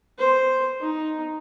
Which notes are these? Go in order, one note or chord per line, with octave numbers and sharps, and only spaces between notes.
C5
D#4